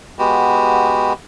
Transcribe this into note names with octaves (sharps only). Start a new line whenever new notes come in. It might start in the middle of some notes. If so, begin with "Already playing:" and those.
G#3 B3 F#4 G4